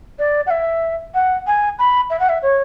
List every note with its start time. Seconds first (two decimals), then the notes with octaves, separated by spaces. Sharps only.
0.18 D5
0.46 F#5
0.50 E5
1.14 F#5
1.46 G#5
1.78 B5
2.09 E5
2.19 F#5
2.28 E5
2.42 C#5